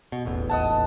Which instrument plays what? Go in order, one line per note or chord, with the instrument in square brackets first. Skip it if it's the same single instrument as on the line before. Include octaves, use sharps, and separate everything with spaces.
[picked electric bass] B2
D#1 A1 E2
[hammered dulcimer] D#5 F#5 A5